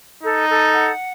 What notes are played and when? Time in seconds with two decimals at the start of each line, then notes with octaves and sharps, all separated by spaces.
0.23 D#4 A4
0.49 A4
0.74 F#5